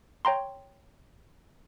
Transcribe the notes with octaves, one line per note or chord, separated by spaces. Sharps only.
C#5 G5 A#5 C6